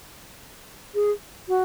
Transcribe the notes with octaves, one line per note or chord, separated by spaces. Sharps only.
G#4
F#4